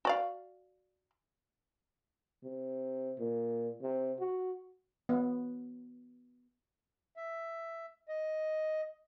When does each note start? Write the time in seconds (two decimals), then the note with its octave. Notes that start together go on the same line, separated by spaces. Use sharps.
0.05 F#4 D5 F5
2.44 C3
3.19 A#2
3.82 C3
4.20 F#4
5.09 B3
7.17 E5
8.08 D#5